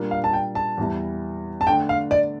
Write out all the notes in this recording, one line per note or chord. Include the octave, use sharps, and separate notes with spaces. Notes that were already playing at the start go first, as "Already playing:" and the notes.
Already playing: A#2 G3 A#3 D4
F5
A5
G5
A5
E2 E3 G3
A5
D3 A3 D4 G5
F5
D5